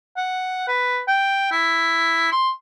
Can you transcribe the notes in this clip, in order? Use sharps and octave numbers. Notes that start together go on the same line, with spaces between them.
F#5
B4
G5
E4
C6